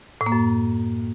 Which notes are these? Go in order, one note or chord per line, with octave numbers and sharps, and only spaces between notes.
A2
A#3
F#2